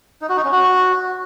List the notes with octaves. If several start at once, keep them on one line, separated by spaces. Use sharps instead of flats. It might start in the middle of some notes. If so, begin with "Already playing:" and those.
D#4
F#4
D#4
C#4
F#4